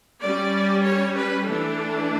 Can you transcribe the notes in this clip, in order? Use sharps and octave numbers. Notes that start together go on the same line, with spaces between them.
G3 C#4 D5
C#5
B4
E3 A3 D4 A4